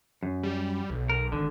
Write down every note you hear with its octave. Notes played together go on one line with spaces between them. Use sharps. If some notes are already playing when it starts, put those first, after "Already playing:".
F#2
G3
B1
A#4
G#1 D3